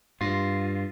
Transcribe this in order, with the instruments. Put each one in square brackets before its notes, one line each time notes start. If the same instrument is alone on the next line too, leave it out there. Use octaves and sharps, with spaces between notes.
[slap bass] G2 [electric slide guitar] F4